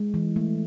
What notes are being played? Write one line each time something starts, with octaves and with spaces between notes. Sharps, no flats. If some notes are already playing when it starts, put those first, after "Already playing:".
Already playing: G#3
E3
A3